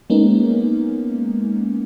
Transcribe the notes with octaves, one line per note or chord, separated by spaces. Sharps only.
G#3 A#3 B3 C#4 D#4